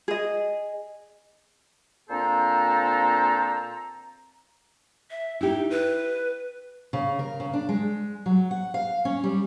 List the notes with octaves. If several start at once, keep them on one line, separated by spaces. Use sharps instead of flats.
G#4 D#5
A#2 C4 D4 A4 C5 A#5
E5
D#4 E4 G4
B4
C#3
A#4
C#3
D4
G#3
F#3
F#5
F5
C#4
G3